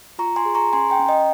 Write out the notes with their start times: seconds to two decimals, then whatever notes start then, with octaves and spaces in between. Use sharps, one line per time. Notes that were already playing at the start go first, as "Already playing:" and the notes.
0.19 F4 A#5 C#6
0.36 G#5 C6
0.45 G#4
0.55 A#5 C#6
0.73 C#4 G#5 C6
0.90 G5 A#5
0.99 C#4
1.09 D#5 G5